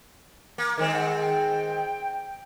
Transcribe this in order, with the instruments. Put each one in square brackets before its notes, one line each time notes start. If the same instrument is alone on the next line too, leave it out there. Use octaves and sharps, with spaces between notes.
[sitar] A#3
[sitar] D#3 G#3 C4 [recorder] A#4
[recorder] F#5
G5